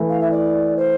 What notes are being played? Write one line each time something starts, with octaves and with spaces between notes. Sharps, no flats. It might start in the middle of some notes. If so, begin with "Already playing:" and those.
Already playing: E3 A3 E4
F5
E5
D5
C5